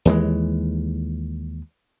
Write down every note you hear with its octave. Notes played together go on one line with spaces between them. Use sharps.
D#2 E3 G#3